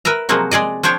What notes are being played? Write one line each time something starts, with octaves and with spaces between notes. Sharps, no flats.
A#4 B4 E5 A#5
C3 F3 F#3 G#3 A#3 F#4
G#3 G#4 D5 D#5
F3 D4 C5 C#5 G5